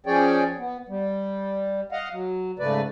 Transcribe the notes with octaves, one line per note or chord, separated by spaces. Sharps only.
F3 C#4 G#4 C#5 D5 G5
B3
G3
D#5 F5 F#5
F#3
G#2 C#3 A3 B4 D5